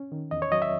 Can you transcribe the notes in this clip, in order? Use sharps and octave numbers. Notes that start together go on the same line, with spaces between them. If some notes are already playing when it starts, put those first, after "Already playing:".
Already playing: C#4
D#3
E2 D#5
C#5
F#3 D#5
E5